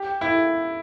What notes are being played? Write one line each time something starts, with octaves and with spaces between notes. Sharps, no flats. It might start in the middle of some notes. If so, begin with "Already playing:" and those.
Already playing: G4
E4